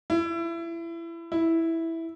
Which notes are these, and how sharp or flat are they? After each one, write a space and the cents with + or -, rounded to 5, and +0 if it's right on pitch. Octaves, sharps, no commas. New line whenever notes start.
E4 +25
E4 -5